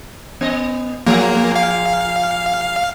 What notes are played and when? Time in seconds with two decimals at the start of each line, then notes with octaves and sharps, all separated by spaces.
0.41 B3 D#5
1.07 A#2 F3 A#3 G#4
1.56 F5